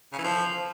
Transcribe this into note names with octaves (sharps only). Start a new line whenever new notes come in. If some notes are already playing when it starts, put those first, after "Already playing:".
C#3
E3
F3